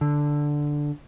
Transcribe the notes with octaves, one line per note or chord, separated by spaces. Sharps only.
D3